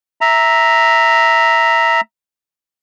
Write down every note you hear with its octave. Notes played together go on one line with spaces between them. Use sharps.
E5 A#5